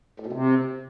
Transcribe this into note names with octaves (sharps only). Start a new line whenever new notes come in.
A2
B2
C3